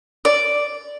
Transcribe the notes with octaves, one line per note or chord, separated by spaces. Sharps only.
D5